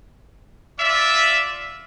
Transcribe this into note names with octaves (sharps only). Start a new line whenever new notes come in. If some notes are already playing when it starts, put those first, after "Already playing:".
F4 D5 E5